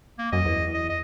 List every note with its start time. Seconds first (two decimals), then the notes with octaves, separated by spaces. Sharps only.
0.19 A#3
0.33 F#2 D#5
0.45 E2
0.74 D#5
0.90 D#5